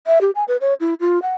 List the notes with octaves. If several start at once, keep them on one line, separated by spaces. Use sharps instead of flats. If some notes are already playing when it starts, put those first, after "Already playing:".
E5
G4
G#5
B4
C#5
E4
F4
F#5